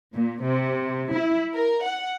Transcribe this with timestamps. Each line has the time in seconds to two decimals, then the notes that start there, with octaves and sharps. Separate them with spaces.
0.14 A#2
0.44 C3
1.13 E4
1.54 A#4
1.85 F#5